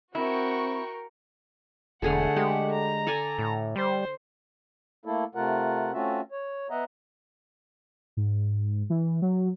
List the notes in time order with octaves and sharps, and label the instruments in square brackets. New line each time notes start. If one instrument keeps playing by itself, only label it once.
[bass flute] C4 [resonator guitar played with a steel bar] E4 [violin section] F#4 G5 C#6 [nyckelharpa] A#4
[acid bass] E1 [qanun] D3 G#4 A4 [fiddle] A3 F#5
[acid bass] G#3 [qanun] G4
[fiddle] A#5
[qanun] A4 D5 G#5
[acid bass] A2
[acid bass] G3 [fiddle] C5
[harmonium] A3 A#3 E4 A4
C3 A3 F4 A#4 F#5
A3 C4 C#4 F4 F#4 E5
C#5
B3 D#5 E5 F#5 A#5
[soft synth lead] G#2
E3
F#3